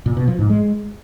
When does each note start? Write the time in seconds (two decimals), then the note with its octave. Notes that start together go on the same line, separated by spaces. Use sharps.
0.06 A#2
0.17 B2
0.28 F3
0.39 G#2
0.50 G#3